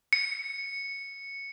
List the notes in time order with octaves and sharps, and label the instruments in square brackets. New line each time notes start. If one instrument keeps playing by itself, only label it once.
[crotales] C#7